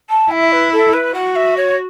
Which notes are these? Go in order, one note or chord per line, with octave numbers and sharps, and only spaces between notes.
A5
E4 E5
B4
A4
B4
F#4 F#5
E5
C#5